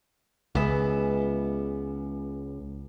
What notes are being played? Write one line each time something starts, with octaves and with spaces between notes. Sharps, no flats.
C#2 B3 G#4 E5